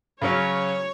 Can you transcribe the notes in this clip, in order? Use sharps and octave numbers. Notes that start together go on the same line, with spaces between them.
C#3 F#3 C#4 C#5